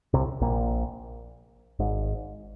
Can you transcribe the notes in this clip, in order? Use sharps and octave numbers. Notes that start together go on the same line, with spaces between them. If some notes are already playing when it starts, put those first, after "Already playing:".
C2 C3
A#1 A#2
G#1 G#2